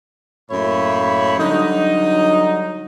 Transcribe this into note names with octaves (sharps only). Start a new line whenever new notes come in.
F#2 A2 A#3 C#5 E5 B5
D3 F#3 G3 D#4